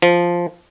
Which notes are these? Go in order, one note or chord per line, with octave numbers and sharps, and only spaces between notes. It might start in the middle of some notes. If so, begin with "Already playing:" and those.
F3